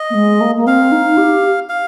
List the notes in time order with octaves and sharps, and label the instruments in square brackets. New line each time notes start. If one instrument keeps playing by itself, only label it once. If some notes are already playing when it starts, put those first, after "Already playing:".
Already playing: [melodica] D#5
[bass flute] A#3
G#3
A#3
A#3
[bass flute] C4 [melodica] F5
[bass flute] D#4
G4
[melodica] F5